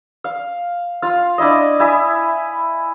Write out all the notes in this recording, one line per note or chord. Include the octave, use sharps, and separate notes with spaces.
F5
F4 F5
D4 E4 D#5
E4 G#5 B5 D#6